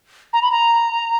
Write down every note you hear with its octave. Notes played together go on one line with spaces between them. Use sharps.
A#5
B5
A#5